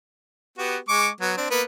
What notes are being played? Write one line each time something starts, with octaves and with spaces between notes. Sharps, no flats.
B3 F#4 G4
G#3 C#6 D6
F#3 B3
C4 D4
A#3 B3 B4